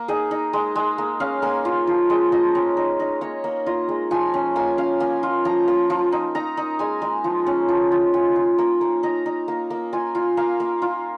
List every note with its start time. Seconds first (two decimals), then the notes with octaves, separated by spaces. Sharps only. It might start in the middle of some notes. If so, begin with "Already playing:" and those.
Already playing: A#3
0.08 D#4 G#4
0.31 D#4
0.53 G#3
0.76 G#3
0.98 A#3
1.20 C#4 F5
1.42 A#3 G#5
1.65 F4
1.87 F3
2.10 G#3
2.32 F3 D#5
2.55 C#4
2.77 D#4
3.00 D#4
3.21 A#3 C#5
3.44 A#3
3.66 F4 D#5
3.89 G#3
4.11 F3 G#5
4.34 C#4 G#5
4.56 A#3 G#5
4.78 C#4 F5
5.00 A#3 G#5
5.23 F4
5.45 F3 A#5
5.68 A#3
5.90 F3
6.12 D#4
6.35 D#4 A#5
6.57 D#4
6.79 G#3 G#5
7.02 G#3
7.24 F3
7.47 C#4
7.69 F3
7.92 F4
8.14 F4 G#5
8.36 F4
8.58 A#3
8.81 A#3
9.03 D#4 A#5
9.26 D#4
9.48 A#3
9.70 A#3
9.93 F4 G#5
10.15 F4
10.37 A#3 F5
10.60 A#3
10.82 F4